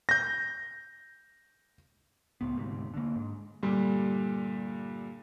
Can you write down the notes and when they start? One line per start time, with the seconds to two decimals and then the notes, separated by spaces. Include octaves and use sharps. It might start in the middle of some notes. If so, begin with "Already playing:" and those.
0.09 G6 A#6
2.41 C#2 A2 B3
2.57 D2 G#2 C3
2.94 D3 A#3
3.16 G#2
3.63 G2 A#2 D3 G3